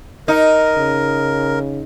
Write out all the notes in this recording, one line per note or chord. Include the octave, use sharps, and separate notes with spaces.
D#4 A#4 D#5
C#3